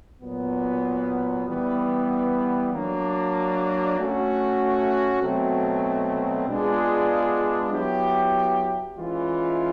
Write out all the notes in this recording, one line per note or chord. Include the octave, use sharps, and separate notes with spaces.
A#2 F#3 B3
E3 G3 B3
F#3 A#3 D4
A3 C#4 F#4
B2 F#3 A3 C4
G#3 B3 D4 F4 G#4
F#3 B3 E4 G4
E3 G#3 C#4 F4